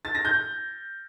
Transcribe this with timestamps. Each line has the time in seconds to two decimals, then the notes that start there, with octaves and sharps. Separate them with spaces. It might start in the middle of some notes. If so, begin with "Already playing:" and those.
0.05 A6
0.15 A#6
0.25 G6